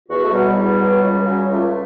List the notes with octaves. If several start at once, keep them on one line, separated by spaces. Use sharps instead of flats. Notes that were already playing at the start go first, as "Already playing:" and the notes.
E2 F#4
A3
B2 F#3 G3
E2
B2 F#3
C#2
C#3 F#3
C#2 A3